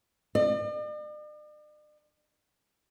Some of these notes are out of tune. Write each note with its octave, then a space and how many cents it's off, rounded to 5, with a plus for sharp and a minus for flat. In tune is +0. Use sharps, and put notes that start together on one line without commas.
D5 +45